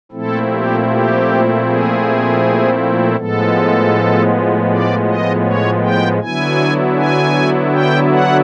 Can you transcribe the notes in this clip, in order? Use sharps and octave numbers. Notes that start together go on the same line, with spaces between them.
A#2 F3 A3 C4 E4 A4
G4
G4
G#4
A2 F3 G#3 B3 A4
D5
D#5
C#5
G5
D3 F#3 B3 E4 G#5
G#5
G5
F#5